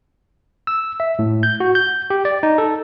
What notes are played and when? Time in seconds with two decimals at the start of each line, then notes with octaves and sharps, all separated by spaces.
0.67 E6
1.00 E5
1.19 A2
1.43 G6
1.60 F#4
1.75 G6
2.10 G4
2.25 D5
2.43 D#4
2.58 A4